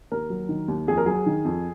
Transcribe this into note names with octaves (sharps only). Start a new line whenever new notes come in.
D#2 A#4
F#3
D#3
D#2
F2 G#4
A#4
F#3 G#4
D#3
F2